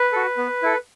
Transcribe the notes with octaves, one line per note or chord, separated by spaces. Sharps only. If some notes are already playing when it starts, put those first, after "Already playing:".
Already playing: B4
F#4 A4
B3
E4 A4